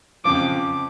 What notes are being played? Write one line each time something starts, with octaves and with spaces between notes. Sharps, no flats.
F2 C#3 F3 D6